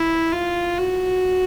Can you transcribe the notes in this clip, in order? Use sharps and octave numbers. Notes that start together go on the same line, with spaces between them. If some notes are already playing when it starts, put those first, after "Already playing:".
Already playing: E4
F4
F#4